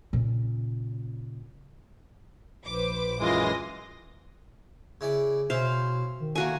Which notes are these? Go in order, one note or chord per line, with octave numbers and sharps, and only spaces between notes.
A#2 C#3
A#1 B4 C5 D6
F#2 E3 G#3 F4 C6 D#6 A#6
C#3 E4 D5
B2 C#4 E4 C5 F5
D#3
A3 A#3 F#4 G#5